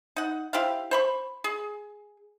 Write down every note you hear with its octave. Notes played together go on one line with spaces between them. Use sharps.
D#4 F#5
E4 G4 C5 F5
C5 B5 C#6
G#4